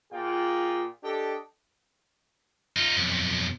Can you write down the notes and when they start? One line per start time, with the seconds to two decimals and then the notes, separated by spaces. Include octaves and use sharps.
0.11 A#2 F4 G#4 G5
1.02 D4 G4 A4 D#5 G5
2.76 D#4 F4
2.97 B1 F2